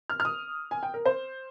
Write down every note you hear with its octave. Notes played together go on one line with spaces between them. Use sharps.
F6
F6
D#6
G#5
G5
A#4
C5